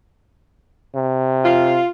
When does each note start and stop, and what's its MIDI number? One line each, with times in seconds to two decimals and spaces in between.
0.95 1.80 48
1.44 1.87 65